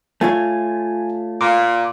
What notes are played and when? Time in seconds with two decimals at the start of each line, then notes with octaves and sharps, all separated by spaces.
0.21 A3 F4 C#5 G#5
1.41 A#2 A#5 C6 D6